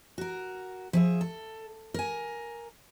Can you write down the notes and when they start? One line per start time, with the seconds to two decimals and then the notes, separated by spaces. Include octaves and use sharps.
0.18 F#4 A#4
0.93 F3 G#4 E5
1.21 A4
1.94 A#4 G#5